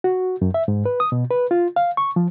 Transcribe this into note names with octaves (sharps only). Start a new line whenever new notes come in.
F#4
F#2
E5
G#2
B4
D#6
B2
B4
F4
F5
C#6
F3